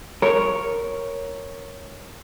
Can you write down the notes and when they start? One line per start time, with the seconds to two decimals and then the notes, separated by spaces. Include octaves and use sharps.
0.22 A#4 C#5